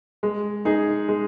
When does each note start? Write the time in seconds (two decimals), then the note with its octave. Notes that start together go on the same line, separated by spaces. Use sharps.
0.23 G#3
0.65 D#4 G#4
1.08 G#3